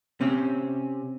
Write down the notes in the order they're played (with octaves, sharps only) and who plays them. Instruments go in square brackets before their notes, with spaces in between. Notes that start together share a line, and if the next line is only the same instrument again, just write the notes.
[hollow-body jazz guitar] C3 C4 C#4